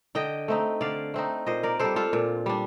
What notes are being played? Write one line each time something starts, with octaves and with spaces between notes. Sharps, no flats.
D3 D#5 G5
A3 C4 D#4
D3 D5 F5
A3 C4 D#4
A#2 C5 D#5
A#4 D5
G3 D4 A4 C5
F4 A4
A#2
G3 D4